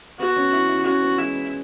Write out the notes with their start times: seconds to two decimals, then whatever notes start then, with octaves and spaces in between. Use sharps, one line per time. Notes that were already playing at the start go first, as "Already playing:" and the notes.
0.19 B3 F#4
0.36 C#4
0.53 E4
0.68 E4
0.85 C#4 F#4
1.02 B3
1.18 G#3 E4
1.35 B3